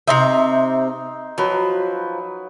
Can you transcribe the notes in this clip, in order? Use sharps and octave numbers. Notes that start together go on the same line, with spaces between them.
C3 C4 D#4 E5 C6
F3 F#3 B4